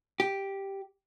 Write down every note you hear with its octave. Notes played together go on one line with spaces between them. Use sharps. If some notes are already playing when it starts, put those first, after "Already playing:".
G4